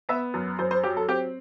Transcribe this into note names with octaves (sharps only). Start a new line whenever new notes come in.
B3 E5
F#2
F#2 C5
C5
F#3 G4
A4
C4 G4